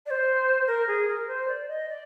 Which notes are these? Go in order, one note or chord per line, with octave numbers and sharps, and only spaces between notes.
D5
C5
A#4
G#4
A#4
C5
D5
D#5
D5